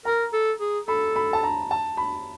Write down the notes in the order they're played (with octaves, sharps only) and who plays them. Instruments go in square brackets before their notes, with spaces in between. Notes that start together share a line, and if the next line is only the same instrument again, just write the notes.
[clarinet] A#4 [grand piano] A#5
[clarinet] A4
G#4
[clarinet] A4 [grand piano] B5
[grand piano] B5
A5
A#5
A5
B5